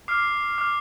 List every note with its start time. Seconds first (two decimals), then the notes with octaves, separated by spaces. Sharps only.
0.08 D6 F6 C7
0.58 D6 F6